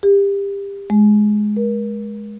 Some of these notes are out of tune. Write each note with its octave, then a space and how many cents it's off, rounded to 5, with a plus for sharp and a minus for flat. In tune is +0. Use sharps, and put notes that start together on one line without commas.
G4 +25
G#3 +15
A#4 +35